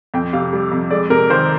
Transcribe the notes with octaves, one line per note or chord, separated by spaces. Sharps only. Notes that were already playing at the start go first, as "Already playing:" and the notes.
F2 G5
C3 F5
G3
F2
G#3 D5
C3 A#4
D#3 C5